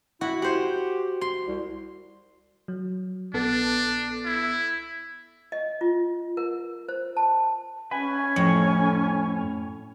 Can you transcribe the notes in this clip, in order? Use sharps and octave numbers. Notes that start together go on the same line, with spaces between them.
E4 F#4
G4 C5 F#5
C6
C2
F#3
A#1 B3 D4 A4
E4
D#5
F4
A#4
C5
A5
C#4 B4 G#5
F2 A2 C#5